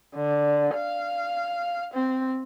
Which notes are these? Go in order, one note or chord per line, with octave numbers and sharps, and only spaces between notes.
D3
F5
C4